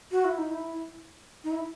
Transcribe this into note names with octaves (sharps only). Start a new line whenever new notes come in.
F#4
E4
D#4
E4
D#4
E4